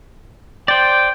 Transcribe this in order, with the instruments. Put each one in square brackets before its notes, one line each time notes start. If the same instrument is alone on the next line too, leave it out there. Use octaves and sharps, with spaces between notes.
[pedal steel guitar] C5 D5 [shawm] G5